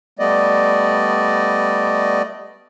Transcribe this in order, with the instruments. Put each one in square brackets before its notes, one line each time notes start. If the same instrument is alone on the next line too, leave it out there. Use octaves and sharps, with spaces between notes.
[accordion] G3 A3 B3 D5 D#5